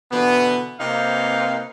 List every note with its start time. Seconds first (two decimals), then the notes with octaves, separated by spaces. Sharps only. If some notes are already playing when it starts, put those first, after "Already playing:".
0.12 B2 D3 E3 B3
0.80 C3 A#3 C4 D#4 B4 F5